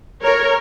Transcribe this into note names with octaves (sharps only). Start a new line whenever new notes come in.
A#4 C#5